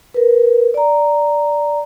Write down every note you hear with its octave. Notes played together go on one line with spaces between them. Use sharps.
A#4 B4
D5 A#5